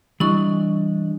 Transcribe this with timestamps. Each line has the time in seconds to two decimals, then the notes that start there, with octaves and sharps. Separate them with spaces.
0.20 E3 G3 D4 E4 D#5 C#6